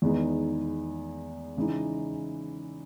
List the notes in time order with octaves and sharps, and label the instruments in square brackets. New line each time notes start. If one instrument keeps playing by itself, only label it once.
[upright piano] E2 D#3 G#3 B3 D#4
C#3 E3 G#3 D#4